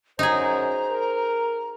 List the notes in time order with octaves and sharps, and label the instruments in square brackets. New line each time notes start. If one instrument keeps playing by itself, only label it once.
[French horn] F#2 [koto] D#4 G#4 [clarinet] C5 [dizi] A#5
[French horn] A#4